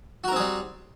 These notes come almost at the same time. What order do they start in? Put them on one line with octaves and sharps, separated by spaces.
F#4 A#4 C4 G#4 G3